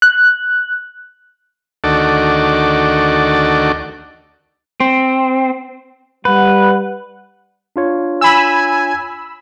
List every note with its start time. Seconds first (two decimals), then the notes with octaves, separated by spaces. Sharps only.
0.02 F#6
1.84 D2 D#3 F#4 A4 D5
4.80 C4
6.25 G3 B4 F#5
7.76 D4 F4 C#5
8.21 G#5 B5 E6